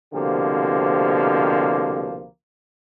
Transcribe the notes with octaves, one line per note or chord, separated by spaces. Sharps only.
C2 B2 D3 F3 A#3 G4